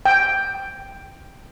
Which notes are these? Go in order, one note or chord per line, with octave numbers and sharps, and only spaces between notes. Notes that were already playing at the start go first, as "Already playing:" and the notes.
G5